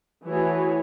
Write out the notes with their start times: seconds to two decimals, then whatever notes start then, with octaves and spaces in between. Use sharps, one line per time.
0.24 E3 A3 E4 F#4 G#4 C#5